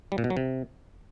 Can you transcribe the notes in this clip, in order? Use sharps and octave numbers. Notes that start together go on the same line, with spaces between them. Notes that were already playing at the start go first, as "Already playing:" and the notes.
G3
A#2
B2
F#3
C3